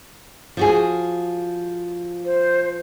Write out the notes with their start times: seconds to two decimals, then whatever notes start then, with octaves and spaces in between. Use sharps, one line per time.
0.57 F3 F#4 G#4
2.25 C5